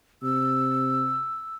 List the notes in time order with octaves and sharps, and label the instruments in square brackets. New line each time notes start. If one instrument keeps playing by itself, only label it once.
[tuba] C3 [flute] E6